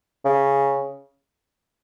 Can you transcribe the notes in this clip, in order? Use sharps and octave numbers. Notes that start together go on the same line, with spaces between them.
C#3